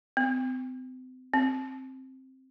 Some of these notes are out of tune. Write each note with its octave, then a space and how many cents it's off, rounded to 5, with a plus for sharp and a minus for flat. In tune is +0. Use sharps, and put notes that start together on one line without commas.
C4 -40
C4 +5